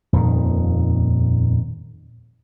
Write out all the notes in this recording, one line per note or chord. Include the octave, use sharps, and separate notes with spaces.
D#1 F2 A#2 D#3